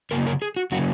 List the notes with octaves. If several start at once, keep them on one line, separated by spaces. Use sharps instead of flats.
C#3 F#3 A#3 A#4
A#4
G#4
F#4
C#3 F#3 A#3 F#4